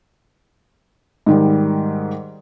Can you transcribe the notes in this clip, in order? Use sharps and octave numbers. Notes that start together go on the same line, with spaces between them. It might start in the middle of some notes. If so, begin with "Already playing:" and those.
G#2 D#3 G3